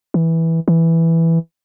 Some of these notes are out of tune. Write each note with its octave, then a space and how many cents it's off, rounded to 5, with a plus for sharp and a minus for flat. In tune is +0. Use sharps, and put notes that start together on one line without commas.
E3 -10
E3 +0